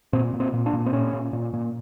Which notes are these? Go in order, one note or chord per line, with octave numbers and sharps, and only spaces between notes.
A#2 C4
A#2
C4
A#2
D4
A#2
C4
A#2 C#4
A#2
A#2
A#2